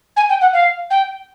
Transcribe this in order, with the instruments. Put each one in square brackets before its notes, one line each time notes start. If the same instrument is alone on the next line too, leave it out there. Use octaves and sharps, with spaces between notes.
[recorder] G#5
G5
F#5
F5
G5